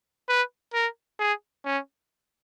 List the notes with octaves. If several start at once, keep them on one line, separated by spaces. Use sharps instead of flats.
B4
A#4
G#4
C#4